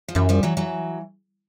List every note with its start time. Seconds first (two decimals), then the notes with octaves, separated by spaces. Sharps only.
0.08 F3
0.15 F#2 E3 F#3
0.29 F3 G3
0.43 E3 F#3
0.57 E3 F#3